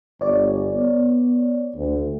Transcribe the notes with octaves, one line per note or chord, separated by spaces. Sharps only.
G1 C#5 D5
B3
D2